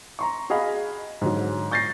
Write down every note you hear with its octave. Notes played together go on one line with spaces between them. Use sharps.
A#5 C6 C#6
F#4 G#4 D#5 F5 B5
G#2 D3 F#3
C#6 G6 A6 A#6 C7